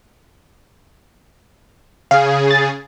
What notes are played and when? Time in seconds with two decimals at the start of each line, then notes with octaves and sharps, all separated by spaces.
2.11 C#3 G#4 F5
2.51 A6